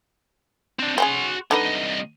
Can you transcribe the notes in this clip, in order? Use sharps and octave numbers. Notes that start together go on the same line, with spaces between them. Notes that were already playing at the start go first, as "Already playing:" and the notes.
C4 D4
C4 C#4 F#4 G#4 C6
C2 D3 D#4 B4 D#5